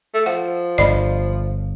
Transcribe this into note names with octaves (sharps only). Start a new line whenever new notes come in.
A3
F3 F#5
G1 D5 D#5 B5